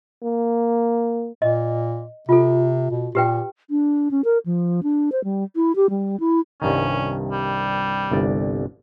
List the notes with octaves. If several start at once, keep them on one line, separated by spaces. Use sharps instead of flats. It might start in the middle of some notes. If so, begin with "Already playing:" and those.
A#3
A#2 D#5
C3 F4 A4
B2
A#2 G4 B4 G5
D4
C#4
A#4
F3
D4
C5
G3
E4
G4
G3
E4
C2 G2 D#3 C#4
G3
G1 C2 D5